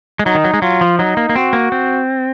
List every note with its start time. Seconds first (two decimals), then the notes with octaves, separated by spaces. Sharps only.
0.19 G#3
0.26 F#3 D#4
0.35 D#3
0.44 F#3
0.54 G#3
0.62 F#3 F4
0.81 F3
0.98 F#3 D#4
1.17 A#3
1.29 A#3
1.36 C4 F#4
1.53 A#3
1.72 C4